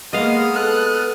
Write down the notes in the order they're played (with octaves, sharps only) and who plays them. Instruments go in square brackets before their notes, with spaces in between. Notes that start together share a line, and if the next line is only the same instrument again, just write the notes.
[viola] G#3 A#3 [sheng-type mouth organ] B3 D#6 F6 [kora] D#5 F5
[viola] A4 [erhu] F#6